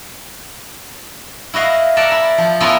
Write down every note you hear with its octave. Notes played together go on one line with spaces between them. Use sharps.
E4 F#4 D#5 F5
A#4 D5 E5 F#5 A5 A#5
E4
F3
B3 C#4 E4 F4 A4 A#4